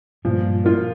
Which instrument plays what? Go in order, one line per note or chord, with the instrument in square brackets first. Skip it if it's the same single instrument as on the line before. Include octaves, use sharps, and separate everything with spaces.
[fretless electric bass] G2 A#2 [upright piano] F3
[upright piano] A#3 F4